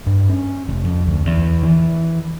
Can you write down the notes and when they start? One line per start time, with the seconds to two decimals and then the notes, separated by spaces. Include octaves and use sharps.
0.06 G2
0.29 C#4
0.68 F1
0.84 F2
1.07 D2
1.26 E2
1.63 E3